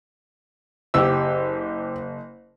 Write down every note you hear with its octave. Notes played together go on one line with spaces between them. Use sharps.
F#1 G4 E6